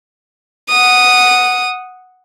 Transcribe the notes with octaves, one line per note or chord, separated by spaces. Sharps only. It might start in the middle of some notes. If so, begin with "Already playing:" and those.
F#5 D#6